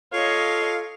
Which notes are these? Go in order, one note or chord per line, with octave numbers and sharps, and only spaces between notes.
F4 A4 C#5 D#5 F5